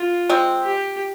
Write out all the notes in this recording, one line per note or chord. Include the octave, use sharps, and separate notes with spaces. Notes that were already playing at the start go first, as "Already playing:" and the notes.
Already playing: F4
G#3 C4
G4